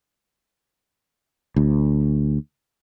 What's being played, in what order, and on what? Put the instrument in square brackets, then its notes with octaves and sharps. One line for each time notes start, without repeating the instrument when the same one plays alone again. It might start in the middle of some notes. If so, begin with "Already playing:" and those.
[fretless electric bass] D2